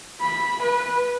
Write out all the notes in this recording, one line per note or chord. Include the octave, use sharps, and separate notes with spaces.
B5
B4